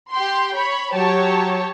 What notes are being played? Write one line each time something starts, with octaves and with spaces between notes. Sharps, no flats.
G4 G5 C6
C#5 B5
F#3 G4 C#5 A5